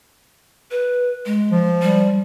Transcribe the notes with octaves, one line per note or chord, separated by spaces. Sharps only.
B4
G#3
F3
G3